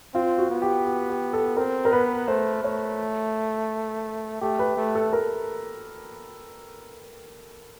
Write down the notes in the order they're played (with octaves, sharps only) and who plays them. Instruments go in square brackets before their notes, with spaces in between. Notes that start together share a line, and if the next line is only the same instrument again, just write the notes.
[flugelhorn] C4 [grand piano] F4
[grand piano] F#4
[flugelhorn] B3
[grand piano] G4
G4
G4
A4
[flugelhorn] C4 [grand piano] A#4
[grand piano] A#4
[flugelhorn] B3 [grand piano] B4
[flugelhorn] A3 [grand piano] C5
[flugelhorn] A3 [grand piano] C#5
[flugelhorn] A3 [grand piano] G4
[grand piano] B4
[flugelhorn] A3
[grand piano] A4
A#4